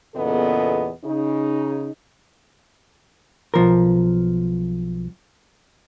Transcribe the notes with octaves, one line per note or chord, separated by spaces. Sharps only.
E2 A#2 C#3 B3 A4 D#5
C#3 D#4
B1 F3 A#4